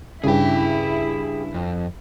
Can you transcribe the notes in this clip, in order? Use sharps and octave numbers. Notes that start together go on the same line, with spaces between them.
G2 C#3 E4 G#4 G5
F2